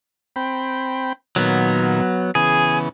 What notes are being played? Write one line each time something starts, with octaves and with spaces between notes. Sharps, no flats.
C4 G5 B5
A#2 D#3 F#3 B3
C#3 E3 B3 G#4